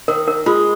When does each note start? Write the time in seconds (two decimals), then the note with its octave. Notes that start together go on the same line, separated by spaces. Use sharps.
0.08 D#3 A#4
0.28 A#4
0.46 G#3 F4